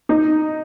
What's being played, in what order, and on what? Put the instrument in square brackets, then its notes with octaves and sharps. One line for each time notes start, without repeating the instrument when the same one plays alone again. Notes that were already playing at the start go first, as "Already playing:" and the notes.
[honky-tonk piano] D#4